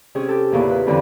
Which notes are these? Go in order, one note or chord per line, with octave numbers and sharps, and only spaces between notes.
C3 C#4 G#4
G4 A4
E2 A#2 C#3 E4
B4
F2 D3 E3 F3